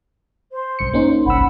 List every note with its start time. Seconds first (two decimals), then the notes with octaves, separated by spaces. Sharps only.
0.52 C5 C6
0.79 B1 G2 C#7
0.93 A#3 C#4 D#4
1.26 G1 C2 F#5 B5 E6